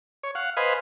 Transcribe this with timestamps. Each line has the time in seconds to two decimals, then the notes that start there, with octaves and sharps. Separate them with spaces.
0.23 C#5
0.35 F5 F#5
0.57 B4 C5 D#5 F5 G#5 B5